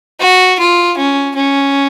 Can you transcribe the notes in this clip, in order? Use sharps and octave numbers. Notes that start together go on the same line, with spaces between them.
F#4
F4
C#4
C#4